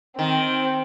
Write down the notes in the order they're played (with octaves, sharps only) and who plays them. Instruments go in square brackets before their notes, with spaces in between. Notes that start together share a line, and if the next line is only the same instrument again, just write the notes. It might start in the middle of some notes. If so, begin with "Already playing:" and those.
[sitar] D#3 [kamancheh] C4 G5